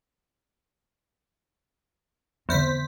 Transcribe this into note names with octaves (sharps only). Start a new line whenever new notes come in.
E2 D3 C4 C5 B6